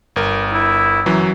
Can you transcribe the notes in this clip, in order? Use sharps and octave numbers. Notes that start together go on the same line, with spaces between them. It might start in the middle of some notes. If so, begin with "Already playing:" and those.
G1 A#4
E4
F#2 E3 F#3